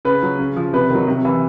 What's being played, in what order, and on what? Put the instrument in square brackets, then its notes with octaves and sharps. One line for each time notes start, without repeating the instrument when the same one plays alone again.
[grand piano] C#3 B4
F#3
C#3
F3
C3 B4
D#3 F#3
C3
E3